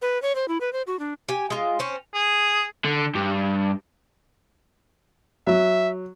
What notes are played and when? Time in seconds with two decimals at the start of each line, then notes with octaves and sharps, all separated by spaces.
0.02 B4
0.22 C#5
0.35 C5
0.48 E4
0.61 B4
0.73 C5
0.87 F#4
0.99 D4
1.29 G4 G#5
1.50 G#3 F4
1.79 C4 C#4 C5
2.14 G#4
2.85 D3
3.15 G2
5.47 F#3 E5